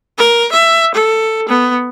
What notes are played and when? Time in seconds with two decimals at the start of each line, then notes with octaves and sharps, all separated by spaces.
0.18 A#4
0.52 E5
0.94 A4
1.48 B3